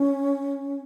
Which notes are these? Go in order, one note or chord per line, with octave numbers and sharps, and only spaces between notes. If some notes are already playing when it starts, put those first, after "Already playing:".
Already playing: C#4